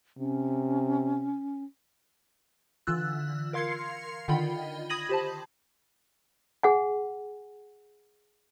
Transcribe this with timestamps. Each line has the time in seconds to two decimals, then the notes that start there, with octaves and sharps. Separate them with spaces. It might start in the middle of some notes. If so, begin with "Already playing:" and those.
0.18 C3 C#4
2.87 D3 E3 F4 E6 F#6
3.53 A#4 F5 C6 G#6 C7 C#7
4.28 D3 D#3 F4 D#5 G5 B5
4.90 B5 D#6 G#6 A#6 D#7 F#7
5.09 G4 C5 A5
6.63 G#4 F#5 G#5